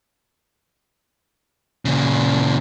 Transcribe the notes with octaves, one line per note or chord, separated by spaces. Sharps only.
A#2 C#3